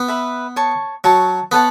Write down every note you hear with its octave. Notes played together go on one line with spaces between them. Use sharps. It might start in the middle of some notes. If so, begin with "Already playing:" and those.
Already playing: B3
B4 E5 B5
C#5 A5 C#6
F#3 C#5 A5 C#6
B3 A4 C#5 F#5 A5